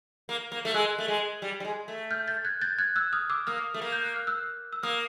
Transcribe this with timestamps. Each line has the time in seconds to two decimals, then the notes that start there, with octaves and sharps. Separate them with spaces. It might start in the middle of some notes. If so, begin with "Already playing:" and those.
0.29 A#3
0.52 A#3
0.65 A3
0.74 G#3 E6 F#6
0.98 A3
1.08 G#3
1.42 G3
1.60 G3
1.65 G#3
1.88 A3
2.11 F6 G6
2.28 G6 A6
2.45 F#6 G#6
2.61 G6 A6
2.78 F#6 G#6
2.96 E6 F#6
3.13 D#6 F6
3.30 D6 E6
3.47 A#3 D#6 F6
3.74 A3
3.82 A#3
3.92 G6
4.04 F#6
4.16 F6
4.27 E6 F#6
4.73 E6
4.83 A#3 D#6 F6